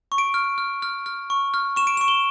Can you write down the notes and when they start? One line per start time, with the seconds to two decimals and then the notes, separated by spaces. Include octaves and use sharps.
0.12 C#6
0.18 D7
0.34 F6
0.58 F6
0.82 F6
1.06 F6
1.30 C#6
1.54 F6
1.76 C#6 E7
1.87 D7
1.97 E7
2.01 C#6
2.08 G7